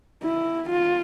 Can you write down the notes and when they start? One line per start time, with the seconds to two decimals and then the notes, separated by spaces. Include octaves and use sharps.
0.23 E4
0.70 F4